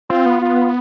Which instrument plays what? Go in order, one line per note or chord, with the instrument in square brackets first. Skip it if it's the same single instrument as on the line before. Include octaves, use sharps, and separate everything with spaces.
[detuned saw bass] C4 [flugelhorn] F4
[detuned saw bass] B3
[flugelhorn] F4